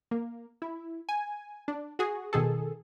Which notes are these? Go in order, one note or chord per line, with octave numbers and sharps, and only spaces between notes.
A#3
E4
G#5
D4
F#4 G#4
B2 D#3 G#4 A4